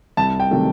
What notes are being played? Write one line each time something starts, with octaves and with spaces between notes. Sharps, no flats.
C2 A5
G5
C3 D#3 F#3 A3